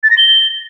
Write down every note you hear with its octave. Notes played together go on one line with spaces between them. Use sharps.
A6
A#6
G7